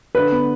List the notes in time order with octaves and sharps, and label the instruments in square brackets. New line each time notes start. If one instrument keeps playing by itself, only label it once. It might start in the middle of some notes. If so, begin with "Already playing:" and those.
[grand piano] D3 [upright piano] B4
[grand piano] B3